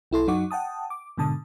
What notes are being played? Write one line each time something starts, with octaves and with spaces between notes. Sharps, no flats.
B1 E4 A4 C6
F#2 F#3 D#4 F#5 C#6 D6
F#5 G5 A5 D#6
D6
G#2 B2 D3 A5 D#6